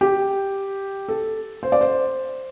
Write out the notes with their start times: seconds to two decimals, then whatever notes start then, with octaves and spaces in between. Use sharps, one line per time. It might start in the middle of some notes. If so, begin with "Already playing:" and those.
0.01 G4
1.08 A4
1.63 C5
1.72 D5
1.81 C5